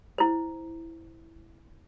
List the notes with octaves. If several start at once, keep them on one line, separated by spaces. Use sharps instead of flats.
E4 C5